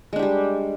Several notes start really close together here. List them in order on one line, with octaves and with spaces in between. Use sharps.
G#3 D4 G4 G3